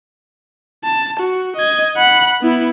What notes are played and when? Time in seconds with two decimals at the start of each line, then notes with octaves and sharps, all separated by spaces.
0.84 A5
1.20 F#4
1.56 D#5 G#6
1.97 F#5 B5
2.42 B3 E4